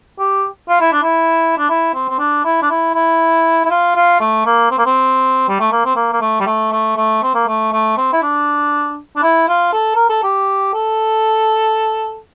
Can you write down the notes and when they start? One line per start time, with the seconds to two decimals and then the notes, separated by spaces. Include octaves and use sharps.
0.19 G4
0.69 F4
0.81 E4
0.92 D4
1.03 E4
1.58 D4
1.70 E4
1.94 C4
2.09 C4
2.19 D4
2.45 E4
2.62 D4
2.70 E4
2.94 E4
3.65 E4
3.70 F4
3.96 F4
4.20 A3
4.46 A#3
4.71 C4
4.78 A#3
4.86 C4
5.49 G3
5.60 A3
5.72 A#3
5.85 C4
5.96 A#3
6.13 A#3
6.21 A3
6.40 G3
6.47 A3
6.72 A3
6.97 A3
7.23 C4
7.35 A#3
7.48 A3
7.73 A3
7.97 C4
8.13 E4
8.23 D4
9.16 D4
9.23 E4
9.49 F4
9.73 A4
9.95 A#4
10.10 A4
10.23 G4
10.74 A4